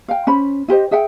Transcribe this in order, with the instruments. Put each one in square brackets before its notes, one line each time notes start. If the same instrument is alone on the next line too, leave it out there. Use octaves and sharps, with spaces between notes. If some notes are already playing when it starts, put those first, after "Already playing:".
[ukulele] F5 G5
C#4 C5 B5
E4 G4 C5 D#5
G#4 E5 F#5 G5